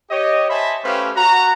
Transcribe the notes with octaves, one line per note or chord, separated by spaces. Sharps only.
G4 C#5 D#5
C5 E5 G#5 A5 B5
A3 C#4 G4 B4 C5 F5
F#4 A#5